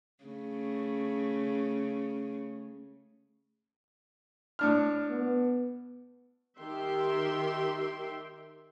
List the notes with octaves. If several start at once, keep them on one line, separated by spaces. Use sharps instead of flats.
C#3 A3
A2 D4 F6
B3
D#3 G4 E5 G5 C6